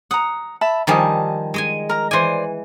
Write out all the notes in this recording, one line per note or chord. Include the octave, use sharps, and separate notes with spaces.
F#5 A#5 D#6
E5 A5 B5
D#3 F3 G3 D#5 G#5 A5
G#3 D#5 G#5
A#4 A#5
E3 C5 D5 G#5